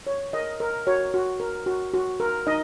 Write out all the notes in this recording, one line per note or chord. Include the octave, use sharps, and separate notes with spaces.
C#5
A#4 D#5
A#4 D#5
F#4 C#5
F#4
A#4
F#4
F#4
A#4
D#4 D#5